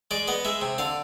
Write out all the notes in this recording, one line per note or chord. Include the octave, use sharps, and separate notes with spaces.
G#3 D5
B3 D#5
G#3 E5
C3
D3 F5